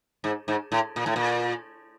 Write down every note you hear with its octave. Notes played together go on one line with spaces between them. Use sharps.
G#2
G#2
A2
A#2
A2
A#2